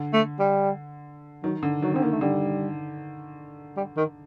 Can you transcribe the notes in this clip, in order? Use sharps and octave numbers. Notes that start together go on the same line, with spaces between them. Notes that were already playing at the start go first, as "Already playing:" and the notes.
Already playing: D3
A3
G3
D#3 F#3
D3
D#3 F#3
D3 C4
D#3 A#3
A3
D3 G3
G3
D#3